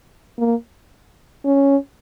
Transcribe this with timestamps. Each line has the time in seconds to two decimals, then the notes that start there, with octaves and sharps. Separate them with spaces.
0.38 A#3
1.45 C#4